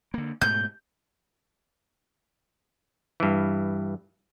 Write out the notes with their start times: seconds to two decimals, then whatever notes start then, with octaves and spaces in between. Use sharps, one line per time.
0.14 D3 A#3
0.42 G#2 B2 A3 G6
3.20 G2 E3